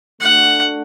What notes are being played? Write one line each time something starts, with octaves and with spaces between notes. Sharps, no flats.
A3 D4 F#4 F#5